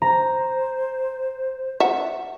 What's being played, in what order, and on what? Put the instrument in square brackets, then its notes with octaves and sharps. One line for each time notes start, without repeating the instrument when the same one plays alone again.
[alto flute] C5 [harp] A#5
[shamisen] E5 F#5